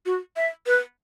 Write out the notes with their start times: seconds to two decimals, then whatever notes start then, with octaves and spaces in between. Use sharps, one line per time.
0.06 F#4
0.36 E5
0.66 B4